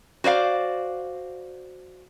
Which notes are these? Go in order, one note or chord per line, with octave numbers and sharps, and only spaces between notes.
F#4 C5 D5 F5